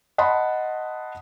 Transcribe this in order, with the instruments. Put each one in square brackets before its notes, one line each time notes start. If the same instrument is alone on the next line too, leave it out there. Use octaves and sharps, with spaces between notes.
[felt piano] D#5 F#5 A5 B5 C6